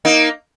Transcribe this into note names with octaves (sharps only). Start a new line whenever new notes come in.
A#3 D#4